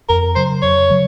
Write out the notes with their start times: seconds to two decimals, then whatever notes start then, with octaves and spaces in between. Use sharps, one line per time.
0.09 F2 A#4
0.35 C#3 F#3 C5
0.62 F2 C#5
0.90 C#3 F#3